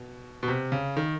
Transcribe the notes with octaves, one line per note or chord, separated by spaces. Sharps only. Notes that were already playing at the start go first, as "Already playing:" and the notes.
Already playing: B2
B2
C3
C#3
D#3